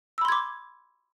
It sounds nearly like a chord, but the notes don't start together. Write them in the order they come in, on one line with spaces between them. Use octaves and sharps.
E6 B5 C6 G#6 D6